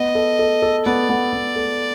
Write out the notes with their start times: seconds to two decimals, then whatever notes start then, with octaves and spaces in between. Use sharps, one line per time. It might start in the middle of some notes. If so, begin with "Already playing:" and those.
Already playing: B3 D#5
0.15 A4
0.39 A4
0.62 A4
0.86 B3 D5
1.09 B3
1.33 B3
1.56 A4